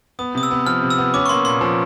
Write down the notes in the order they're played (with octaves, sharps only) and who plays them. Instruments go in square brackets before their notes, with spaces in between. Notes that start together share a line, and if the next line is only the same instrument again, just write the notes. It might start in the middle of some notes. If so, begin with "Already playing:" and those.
[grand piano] B3 [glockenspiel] D#6
[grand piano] C3 [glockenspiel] D#6
[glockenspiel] E6
[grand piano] B3
[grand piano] F3 [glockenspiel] F6
[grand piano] C3
[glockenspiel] E6
[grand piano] B3
[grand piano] C#4 [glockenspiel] D6
[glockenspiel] C#6
[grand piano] A#3 [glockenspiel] C6
[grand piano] A#2 [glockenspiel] C6
[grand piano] F3